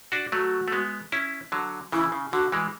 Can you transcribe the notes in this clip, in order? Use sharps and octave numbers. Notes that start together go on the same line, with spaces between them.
D4 F#4
F#3 A3 F#4
A3
G#3 B3
C#4 E4
D3 F#3
C#3 E3 E4
C#3
D3 F#4
E3 G#3